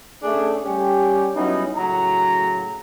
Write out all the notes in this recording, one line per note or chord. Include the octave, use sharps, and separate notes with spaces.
A3 C#4 D4 G#4
G3 C#4 G4
F#3 G3 B3 C#4 D#4 E4
A2 C#3 F#3 A#5